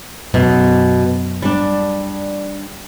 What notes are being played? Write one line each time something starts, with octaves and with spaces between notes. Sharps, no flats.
F#2 B2
G3 D4